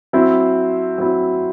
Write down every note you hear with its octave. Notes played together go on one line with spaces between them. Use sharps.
F#3 C4 E4
F#3 C4 E4